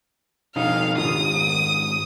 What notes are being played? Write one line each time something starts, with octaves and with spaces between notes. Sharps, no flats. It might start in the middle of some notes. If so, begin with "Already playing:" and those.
B2 F3 D#4 F5
G#2 D#3 F4 D#6